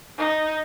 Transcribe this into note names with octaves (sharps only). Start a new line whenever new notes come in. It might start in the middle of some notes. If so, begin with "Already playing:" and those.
D#4